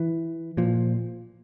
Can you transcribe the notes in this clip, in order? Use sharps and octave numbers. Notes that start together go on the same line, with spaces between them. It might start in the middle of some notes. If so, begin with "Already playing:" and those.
Already playing: E3
A#2 F3